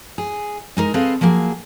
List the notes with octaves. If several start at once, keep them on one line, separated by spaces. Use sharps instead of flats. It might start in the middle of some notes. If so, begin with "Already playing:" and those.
G#4
G#3 D#4 A#4
C4 G#4 A4 B4 D#5 F5
F3 F#3 A#3 G#4